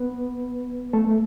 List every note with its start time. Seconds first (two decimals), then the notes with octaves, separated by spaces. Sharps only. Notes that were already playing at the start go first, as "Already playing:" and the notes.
Already playing: B3 B4
0.93 A3 A4